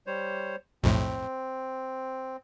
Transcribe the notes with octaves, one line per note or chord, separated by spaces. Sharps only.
G3 C5 C#5
B1 F2 A2 C4